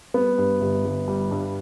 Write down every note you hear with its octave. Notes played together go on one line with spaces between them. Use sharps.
G3 B3
G2
G1
G1
G3
G2